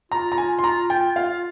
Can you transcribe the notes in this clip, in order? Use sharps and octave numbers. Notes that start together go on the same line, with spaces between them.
F4 A#5
A#5
G#5
C6
A#5
G5
F5